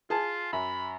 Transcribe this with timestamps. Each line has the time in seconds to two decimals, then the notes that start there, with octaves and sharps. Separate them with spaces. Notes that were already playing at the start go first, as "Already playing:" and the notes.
0.10 F4 G#4 A5
0.53 F#2 B5